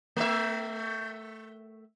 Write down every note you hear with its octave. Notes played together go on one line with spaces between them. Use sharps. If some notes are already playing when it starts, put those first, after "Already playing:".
A3 E5